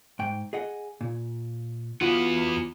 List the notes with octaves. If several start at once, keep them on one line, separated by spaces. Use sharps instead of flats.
G#2 G5
G#4 D#5 F#5
A#2
E2 B3 F4 F#4